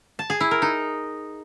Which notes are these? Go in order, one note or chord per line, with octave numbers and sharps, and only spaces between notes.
A5
G#4
E4
A#4
D#4